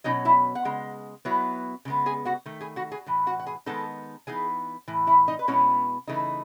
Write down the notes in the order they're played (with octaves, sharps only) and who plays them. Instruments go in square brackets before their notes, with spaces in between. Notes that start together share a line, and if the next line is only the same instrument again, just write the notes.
[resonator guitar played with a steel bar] B2 F#3 C#4 D#4 D#5
E4 E5
F#5
C#3 G#3
F#3 B3 E4
C#3 G#3 B3
G#4 G#5
F#4 F#5
D#3 A3
G#4 G#5
F#4 F#5
G#4 G#5
A2 E3
F#4 F#5
F#5
G#4 G#5
D#3 G#3 B3 D#4 A4 A5
E3 B3 D#4 G#4 G#5
A2 E3
E4 E5
D#4 D#5
B4
B2 G#3 B3 C#4 E4 C#5
C#3 E3 A3 D#4